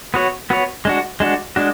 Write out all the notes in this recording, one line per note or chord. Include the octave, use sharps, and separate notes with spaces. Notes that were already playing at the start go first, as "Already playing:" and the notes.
B3 F#4 C#5
B3 F#4 C#5
G#3 D4 F#4
G#3 D4 F#4
G#3 D4 F#4